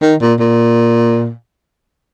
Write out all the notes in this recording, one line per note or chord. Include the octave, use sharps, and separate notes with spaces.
D#3
A#2
A#2